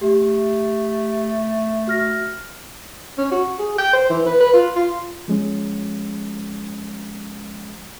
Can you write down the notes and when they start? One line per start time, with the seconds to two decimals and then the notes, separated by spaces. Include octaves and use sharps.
0.01 A3 G4
1.87 F#4 F6 A#6
3.18 C#4
3.32 F#4
3.59 G#4
3.78 G5
3.93 C5
4.10 E3
4.26 B4
4.40 B4
4.53 F4
4.76 F4
5.28 F3 G#3 C#4